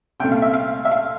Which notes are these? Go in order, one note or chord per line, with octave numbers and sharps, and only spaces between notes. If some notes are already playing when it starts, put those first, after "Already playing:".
C2 A#2 A3 G5
F5
E5
F5
E5
F5